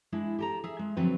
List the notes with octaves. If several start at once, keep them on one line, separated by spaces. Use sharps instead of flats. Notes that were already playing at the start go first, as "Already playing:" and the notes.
G#3 D4 E4
G4 A4 A#5
G#4 E5
G#3
D3 F3 F#3 C4 B4